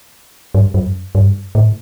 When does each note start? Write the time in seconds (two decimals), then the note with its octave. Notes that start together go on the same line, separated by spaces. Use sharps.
0.55 G2
0.74 F#2
1.15 G2
1.55 A2